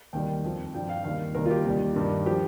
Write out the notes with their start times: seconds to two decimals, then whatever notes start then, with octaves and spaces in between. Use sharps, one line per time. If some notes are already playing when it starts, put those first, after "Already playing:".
0.13 D#2 D#3 G3 G5
0.44 F2 F3
0.74 G2 F3 G5
0.89 F5
1.04 D#2 D#3 G3 F5
1.35 D#2 D#3 G3 A#4
1.46 F4
1.50 G4
1.65 D#2 D#3 G3
1.96 G2 D#3 G3
2.26 F3 G4